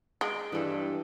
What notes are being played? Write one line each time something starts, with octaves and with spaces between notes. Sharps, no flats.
G#3 G5
G2 E3 A4